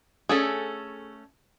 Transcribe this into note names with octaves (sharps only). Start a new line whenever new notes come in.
A3 C#4 G#4 A4